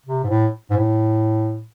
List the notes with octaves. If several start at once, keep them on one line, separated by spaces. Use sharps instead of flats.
C3
G#2
A2
G#2
A2